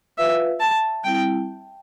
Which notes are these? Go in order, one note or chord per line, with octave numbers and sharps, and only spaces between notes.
F4 B4 E5 F5
A5
G3 C4 E4 G5